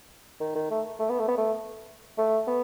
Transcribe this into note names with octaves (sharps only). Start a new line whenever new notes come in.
D#3
D#3
A3
A3
B3
A3
B3
A3
A3
B3